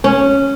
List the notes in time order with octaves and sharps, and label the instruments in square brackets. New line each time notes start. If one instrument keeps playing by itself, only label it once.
[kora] C#4